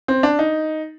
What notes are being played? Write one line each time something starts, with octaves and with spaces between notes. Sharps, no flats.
C4
D4
D#4